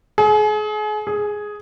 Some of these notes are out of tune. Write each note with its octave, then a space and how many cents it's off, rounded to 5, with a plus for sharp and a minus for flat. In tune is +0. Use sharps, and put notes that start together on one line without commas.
G#4 +35
G#4 +5